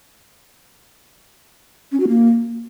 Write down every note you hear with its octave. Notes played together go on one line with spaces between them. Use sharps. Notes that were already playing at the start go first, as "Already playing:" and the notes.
C#4
F#4
A#3